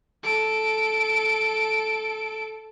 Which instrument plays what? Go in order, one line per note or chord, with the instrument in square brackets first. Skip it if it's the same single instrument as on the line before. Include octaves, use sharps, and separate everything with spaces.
[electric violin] A4 D7